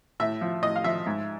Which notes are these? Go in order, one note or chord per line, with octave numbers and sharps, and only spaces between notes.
A2 E5
F3
A2 D#5
F5
F3 E5
G#2